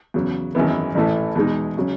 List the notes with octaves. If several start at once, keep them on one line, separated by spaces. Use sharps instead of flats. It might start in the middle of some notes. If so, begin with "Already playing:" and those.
E2 C#3 F#3
G#1 F#2 E3 B3
A1 A2 E3 A3
E2 B2 G#3 D#4
C#3 F#3 C#4